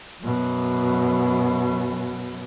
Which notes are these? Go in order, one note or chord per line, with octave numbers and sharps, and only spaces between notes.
F#2 B2